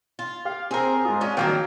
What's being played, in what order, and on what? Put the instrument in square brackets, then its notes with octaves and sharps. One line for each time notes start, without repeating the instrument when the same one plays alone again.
[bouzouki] F4
[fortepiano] G4 [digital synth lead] F5
[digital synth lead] C4 [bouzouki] G#4 A#4
[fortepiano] G#2 D#6 [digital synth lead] F4
[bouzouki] C#4 D4 D#5
[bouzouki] D#3 F3 A#4 [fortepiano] F#3 F5 G5 [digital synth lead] A#3